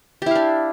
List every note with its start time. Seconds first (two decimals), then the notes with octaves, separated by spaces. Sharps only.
0.22 G4
0.26 E4
0.31 F5
0.35 D4